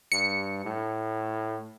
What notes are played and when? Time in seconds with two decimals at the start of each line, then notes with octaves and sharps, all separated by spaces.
0.12 G2 C#7
0.65 A2